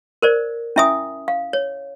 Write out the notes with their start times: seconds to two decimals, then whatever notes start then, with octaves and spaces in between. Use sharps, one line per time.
0.22 A#4 C5 D5
0.76 C#4 E4 E5 G#5 D#6
1.28 F5
1.53 C#5